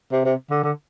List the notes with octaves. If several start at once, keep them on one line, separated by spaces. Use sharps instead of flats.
C3
C3
D3
D3